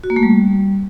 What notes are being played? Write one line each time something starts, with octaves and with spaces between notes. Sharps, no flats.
F#4
A#3
A3
G3